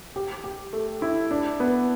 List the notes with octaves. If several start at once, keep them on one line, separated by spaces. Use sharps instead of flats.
G4
G4
A3
E4
D4
B3